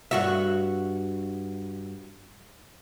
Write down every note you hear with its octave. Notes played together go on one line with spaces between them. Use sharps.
G2 F#4 E5